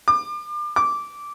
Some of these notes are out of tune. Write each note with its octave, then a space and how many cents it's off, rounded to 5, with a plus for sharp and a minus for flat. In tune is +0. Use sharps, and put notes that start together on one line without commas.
D6 +35
D6 -10